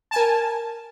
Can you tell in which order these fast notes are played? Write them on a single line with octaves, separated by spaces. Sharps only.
A5 G#5 A#4